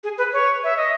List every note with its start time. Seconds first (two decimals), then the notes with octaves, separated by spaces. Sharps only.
0.04 G#4
0.18 B4
0.33 C#5
0.64 E5
0.77 D#5